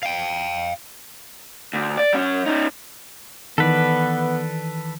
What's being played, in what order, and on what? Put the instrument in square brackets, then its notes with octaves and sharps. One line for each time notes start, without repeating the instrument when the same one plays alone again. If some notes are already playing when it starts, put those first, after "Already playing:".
[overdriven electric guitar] F5 G5
[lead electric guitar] D2
D5
F#3 C#4
C#4 D#4
[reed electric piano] D#3 E3 [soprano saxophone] B3 [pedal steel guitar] A4 B4 D5